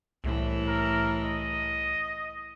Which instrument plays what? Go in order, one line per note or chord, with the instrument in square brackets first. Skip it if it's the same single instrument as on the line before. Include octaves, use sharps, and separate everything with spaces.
[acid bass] C2 [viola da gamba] A2 E3
[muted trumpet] A#4
D#5